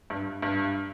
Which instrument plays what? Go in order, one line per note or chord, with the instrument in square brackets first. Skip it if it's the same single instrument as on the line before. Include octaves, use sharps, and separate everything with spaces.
[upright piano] G2
G2